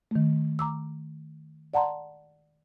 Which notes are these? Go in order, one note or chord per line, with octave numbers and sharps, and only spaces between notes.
D#3 A3
A#5 D6 E6
D5 F#5 A5 A#5 C6